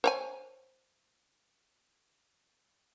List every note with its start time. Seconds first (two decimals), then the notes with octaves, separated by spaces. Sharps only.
0.04 C5 C#5 G#5